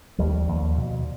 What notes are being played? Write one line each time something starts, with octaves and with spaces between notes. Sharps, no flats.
D#2 F3 G3
D#2
B2